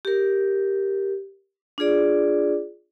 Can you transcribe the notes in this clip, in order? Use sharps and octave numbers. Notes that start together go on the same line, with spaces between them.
G4 A#4
D4 F4 G#4 D5